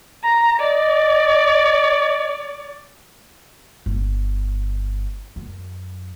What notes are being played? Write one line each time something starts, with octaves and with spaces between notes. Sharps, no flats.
A#5
D5 D#5
G1
F#2